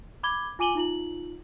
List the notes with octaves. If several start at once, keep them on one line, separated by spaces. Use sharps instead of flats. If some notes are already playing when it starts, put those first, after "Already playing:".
B5 D6 G#6 G7
F4 G#5 D6 D#7 F#7 G7
D#4 F4 F#7